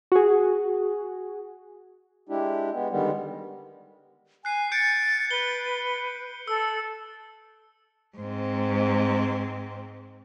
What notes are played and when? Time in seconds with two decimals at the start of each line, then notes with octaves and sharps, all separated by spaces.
0.12 F#4 G#4
2.29 G#3 D4 E4 G4
2.73 G#3 B3
2.90 D3 D#3 G3 G#3 B3
4.45 G#5 F#6 C7
4.72 G6 A6 C#7 D7
5.31 B4 G7
6.48 A4 E6
8.18 G#2 C4